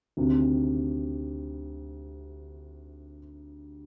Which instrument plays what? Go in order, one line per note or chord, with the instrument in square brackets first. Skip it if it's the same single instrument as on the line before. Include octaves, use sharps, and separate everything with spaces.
[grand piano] D2 C3 D#3